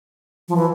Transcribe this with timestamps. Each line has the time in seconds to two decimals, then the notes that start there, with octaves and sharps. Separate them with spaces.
0.48 F3
0.56 E3